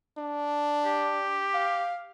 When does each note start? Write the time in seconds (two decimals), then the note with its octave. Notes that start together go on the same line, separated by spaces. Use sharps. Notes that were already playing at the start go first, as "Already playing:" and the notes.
0.18 D4
0.86 G4
1.54 F5